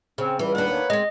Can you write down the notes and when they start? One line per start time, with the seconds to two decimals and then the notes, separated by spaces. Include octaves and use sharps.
0.18 C#3 C4
0.39 C#2 E3 G3
0.55 D#2 D4 B4 F#5
0.69 A#3 C#5
0.90 G#3 C4 D#5